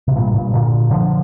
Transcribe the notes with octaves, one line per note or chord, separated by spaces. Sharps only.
C3
G2 A#2
G2 A#2
A#2 D3
D3 F3